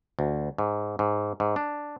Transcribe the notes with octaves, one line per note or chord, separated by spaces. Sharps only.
D2
G#2
G#2
G#2
D4